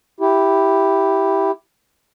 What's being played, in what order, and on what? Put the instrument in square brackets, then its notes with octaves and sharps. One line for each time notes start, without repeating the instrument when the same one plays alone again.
[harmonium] E4 G4